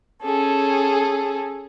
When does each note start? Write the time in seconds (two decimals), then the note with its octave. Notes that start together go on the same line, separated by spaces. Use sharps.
0.24 C#4 G#4 A4